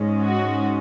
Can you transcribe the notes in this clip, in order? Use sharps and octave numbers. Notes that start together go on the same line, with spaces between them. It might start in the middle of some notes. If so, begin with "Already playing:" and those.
Already playing: G#2 G#3 C#4
F#4